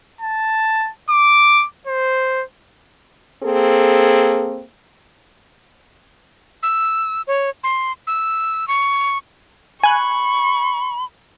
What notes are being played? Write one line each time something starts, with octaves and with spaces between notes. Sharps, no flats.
A5
D6
C5
A#3 C4 G#4 A4
E6
C#5
C6
E6
C#6
G#5 B5 C#6 F#6